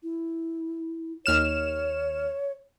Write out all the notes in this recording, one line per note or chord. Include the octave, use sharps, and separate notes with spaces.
E4
D#2 C#5 F6 E7